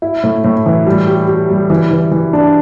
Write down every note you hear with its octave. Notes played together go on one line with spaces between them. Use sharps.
E4
A2
A2
E3
G3
G4
G4
G3
E3
E3
E3
D4